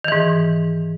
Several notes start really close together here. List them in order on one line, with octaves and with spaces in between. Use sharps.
D#3 E3 G#2